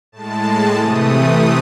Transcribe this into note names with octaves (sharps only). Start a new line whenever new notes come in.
A2 G#3 A5
C3 E3 A3 D#6